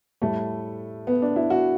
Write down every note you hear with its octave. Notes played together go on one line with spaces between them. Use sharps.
A2 G3 A3
B3
D4
E4
F#4